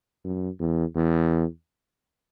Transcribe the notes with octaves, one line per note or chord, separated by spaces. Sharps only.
F#2
E2
E2